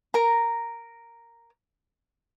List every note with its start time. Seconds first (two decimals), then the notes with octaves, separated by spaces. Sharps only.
0.14 A#4 A#5